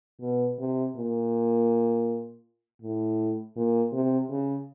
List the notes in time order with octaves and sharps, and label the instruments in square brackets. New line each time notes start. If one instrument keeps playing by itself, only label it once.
[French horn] B2
C3
A#2
A2
A#2
C3
C#3